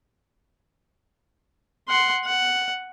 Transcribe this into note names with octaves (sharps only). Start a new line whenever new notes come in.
F#5 C6
F#5